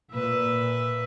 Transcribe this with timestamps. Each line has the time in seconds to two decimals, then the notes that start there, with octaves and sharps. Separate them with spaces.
0.11 A#2 B4 E5